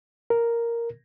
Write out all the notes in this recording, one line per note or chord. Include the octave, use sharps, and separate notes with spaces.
A#4